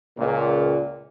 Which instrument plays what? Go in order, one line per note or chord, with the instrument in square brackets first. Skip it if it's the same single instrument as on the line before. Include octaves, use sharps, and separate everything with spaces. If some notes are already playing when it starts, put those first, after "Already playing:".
[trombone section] C#2 A#2